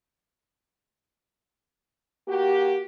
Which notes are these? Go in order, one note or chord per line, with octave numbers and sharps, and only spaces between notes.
A#3 F#4 G4